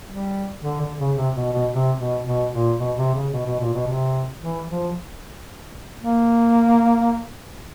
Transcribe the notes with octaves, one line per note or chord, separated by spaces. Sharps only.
G3
D3
D3
C#3
C3
B2
B2
C3
B2
B2
A#2
B2
C3
C#3
B2
B2
A#2
B2
C3
E3
F3
A#3